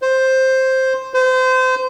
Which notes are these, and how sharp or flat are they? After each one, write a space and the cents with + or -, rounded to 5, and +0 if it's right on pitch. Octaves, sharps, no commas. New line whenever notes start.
C5 +5
C5 -30